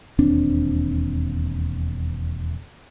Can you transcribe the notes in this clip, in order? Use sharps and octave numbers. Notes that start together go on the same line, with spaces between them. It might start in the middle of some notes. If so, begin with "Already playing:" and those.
E1 D#2 C4 D4